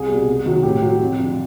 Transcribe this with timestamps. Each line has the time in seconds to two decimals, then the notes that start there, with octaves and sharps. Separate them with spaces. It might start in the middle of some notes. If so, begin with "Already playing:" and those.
Already playing: C2 G#4
0.09 B2 G3
0.28 C2
0.46 C3 D#3 F#3
0.63 A2 G4
0.82 F#3
1.00 F2
1.19 D3 F3